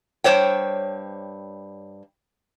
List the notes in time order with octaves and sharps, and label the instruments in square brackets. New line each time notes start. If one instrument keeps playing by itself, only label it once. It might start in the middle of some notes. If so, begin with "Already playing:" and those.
[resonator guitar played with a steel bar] G2 C5 C#5 G5